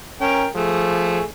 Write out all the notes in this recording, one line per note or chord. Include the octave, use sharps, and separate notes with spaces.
C#4 A#4 G5
F3 A3 G#4